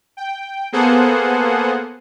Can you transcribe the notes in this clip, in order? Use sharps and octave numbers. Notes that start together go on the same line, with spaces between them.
G5
A#3 B3 G#4 A4 C5 F#5